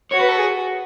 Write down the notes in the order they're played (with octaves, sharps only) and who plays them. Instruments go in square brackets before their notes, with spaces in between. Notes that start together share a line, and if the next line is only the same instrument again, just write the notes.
[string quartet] F#4 [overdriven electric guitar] C#5
[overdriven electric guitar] B4
A4
G#4